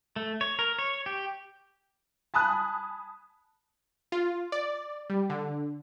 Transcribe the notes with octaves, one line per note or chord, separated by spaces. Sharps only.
A3
C#5
A#4
C#5
G4
G#5 A5 B5 D#6 F#6
F4
D5
G3
D3